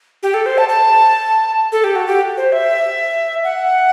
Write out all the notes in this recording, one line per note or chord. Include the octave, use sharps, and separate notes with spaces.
G4
A4
C5
A5
A5
A4
G4
F#4
G4
C5
E5
F#5